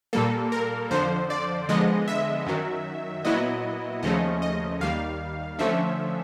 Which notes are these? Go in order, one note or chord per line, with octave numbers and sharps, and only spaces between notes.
A#2 G3 A#3 A4
A#4
F2 D3 F3 C5
D5
D3 F3 G#3 B3 D#5
E5
F#2 D#3 F#3
A#2 F#3 B3 E4 D#5
D#2 C#3 F3 A3 C#4 D#5
D#5
D#2 D#3 G3 F5
D3 F3 A3 C#4 E5